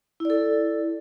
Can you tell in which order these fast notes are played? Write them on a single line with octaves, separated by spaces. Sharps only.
E4 D5 A4